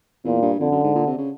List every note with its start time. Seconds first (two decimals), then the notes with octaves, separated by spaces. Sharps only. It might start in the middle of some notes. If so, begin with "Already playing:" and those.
0.25 E2 A#2
0.42 G2
0.60 F2 D3
0.72 F#2
0.83 G#2
0.95 A#2
1.07 C3
1.18 C#3